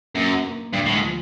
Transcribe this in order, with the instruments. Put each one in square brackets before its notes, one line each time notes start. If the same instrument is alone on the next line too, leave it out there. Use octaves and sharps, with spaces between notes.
[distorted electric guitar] F#2 [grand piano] A#3
[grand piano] A#3
[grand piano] D2 [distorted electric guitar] G2
[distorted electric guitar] A2
G#2
[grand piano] F3